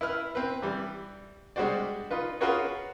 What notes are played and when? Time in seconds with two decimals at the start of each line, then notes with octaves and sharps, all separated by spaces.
0.01 E4 B4 F6
0.35 C4 B4
0.62 E3 G3
1.56 G3 G#3 D4 F#4 C5 D5
2.11 D#4 F4 B4
2.41 F4 F#4 G#4 A#4 B4 C#5